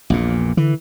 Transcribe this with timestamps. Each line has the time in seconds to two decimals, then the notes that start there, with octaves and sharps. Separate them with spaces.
0.10 A#1 E2 A#2
0.57 D3 E3